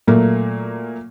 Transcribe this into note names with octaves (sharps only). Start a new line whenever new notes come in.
A#2 F#3 A3 A#3